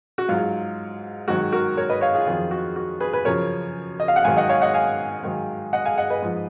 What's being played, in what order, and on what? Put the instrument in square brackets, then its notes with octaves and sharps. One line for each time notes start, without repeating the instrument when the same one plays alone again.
[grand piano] F#4
G#2 F#3 F4
G#2 D#3 F#3 F#4
F#4 A#4
A#4 C#5
B4 D#5
C#5 F5
F4 G#4
F2 D#3 F#3 F4 G#4
F#4
F#4
G#4 B4
G#4 B4
F#2 C#3 F3 A#4 C#5
D#5
F5
F#5
G#2 D#3 F#3 F5 G#5
D#5 F#5
C#5 F5
D#5 F#5
F5 G#5
G#2 D#3 F#3
D#5 F#5
F5 G#5
D#5 F#5
B4 D#5
G#2 F3